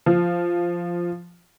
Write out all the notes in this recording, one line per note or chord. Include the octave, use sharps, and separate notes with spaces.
F3